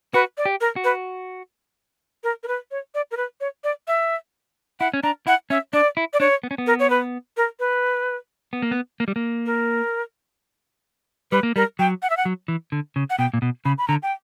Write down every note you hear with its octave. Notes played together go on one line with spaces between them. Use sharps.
F#4 B4
D5
G4
A#4
F#4
B4
A#4
A#4
B4
C#5
D5
A#4
B4
C#5
D5
E5
E4 F#5
C#4
D4 A#5
E4 F#5
C#4 E5
D4 D5
E4
D5
D4 C#5
B3
C#4
B3
A#4
C#5
B4
A#4
B4
B3
A#3
B3
A#3
G3
A#3
A#4
G3 B4
A#3
G3 A#4
F#3 G5
F#5
E5
F#5
F#3
E3
D3
C#3
F#5
B2 G5
A#2
B2
C#3 B5
B5
D3 A#5
G5